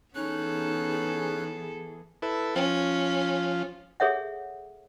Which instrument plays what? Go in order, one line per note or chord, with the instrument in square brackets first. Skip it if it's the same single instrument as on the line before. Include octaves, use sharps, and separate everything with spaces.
[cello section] E3 G#4 [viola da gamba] B3 A4 [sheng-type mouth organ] C#4 F#6 [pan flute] D#4
[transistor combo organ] E4 A4 B4
[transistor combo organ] F3 F4 [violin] C#4
[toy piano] G#4 A4 C#5 E5 F#5